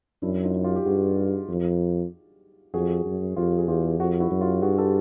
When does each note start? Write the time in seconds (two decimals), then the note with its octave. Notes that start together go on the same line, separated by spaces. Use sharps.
0.22 F#2 D4 E4
0.43 D#4 F4
0.64 F4 G4
0.76 G4
0.85 G2 F#4 G#4
1.49 F2
2.74 F2 F#4 G#4
3.05 F#2
3.36 F2 F4 G4
3.58 G#4
3.68 E2 F4 G4
3.99 F2 F#4 G#4
4.20 E4 F#4
4.31 F#2
4.41 F4 G4
4.62 G2 F#4 G#4
4.78 G4 A4